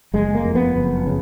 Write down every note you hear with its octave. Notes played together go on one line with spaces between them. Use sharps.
F#1 G#3
A#3
F2
B3
F#1
C#3